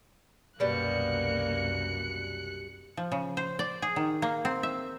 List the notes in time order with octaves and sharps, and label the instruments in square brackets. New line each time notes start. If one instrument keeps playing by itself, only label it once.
[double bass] C2 F#2 [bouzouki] B2 G3 [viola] A#3 [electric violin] F#6 C#7
[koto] F3
C#3
C5
D5
G#4
D#3
A#3
C4
E5